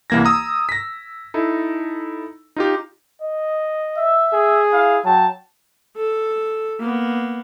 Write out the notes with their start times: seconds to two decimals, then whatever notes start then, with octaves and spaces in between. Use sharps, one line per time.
0.10 C2 E3 A#3 G#6 A#6
0.25 A#5 D#6 E6
0.69 A#6 B6
1.34 D#4 E4 A4
2.56 D#4 F4 G4
3.22 D#5
3.97 E5
4.33 G#4
4.72 E4 F5
5.04 F#3 G5 A5
5.96 A4
6.80 A#3 B3